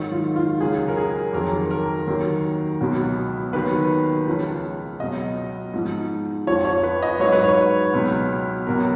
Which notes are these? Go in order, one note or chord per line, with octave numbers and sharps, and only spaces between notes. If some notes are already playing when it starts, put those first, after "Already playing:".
Already playing: G#2 D#3 F#3
F4
F4
C#2 C#3 F#3 G#4
A#4
G#4
F2 D#3 F#3 A#4
A#4
D#2 D#3 F#3
C#2 B2 F#3
D#2 D#3 F#3 B4
C#2 C#3 F3
C#2 B2 F#3 D#5
G#2 F3
F2 F3 C#5
C#5
B4
D#5
G#2 F#3 C#5
B4
C#5
C#2 B2 F#3
C#2 B2 F#3 A#4